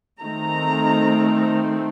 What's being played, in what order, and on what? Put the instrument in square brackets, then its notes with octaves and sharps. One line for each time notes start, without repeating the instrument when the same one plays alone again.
[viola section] D#3 A3 C4 A#5